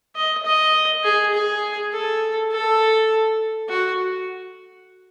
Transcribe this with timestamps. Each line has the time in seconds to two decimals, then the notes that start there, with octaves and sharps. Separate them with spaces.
0.16 D#5
0.45 D#5
1.04 G#4
1.34 G#4
1.92 A4
2.52 A4
3.69 F#4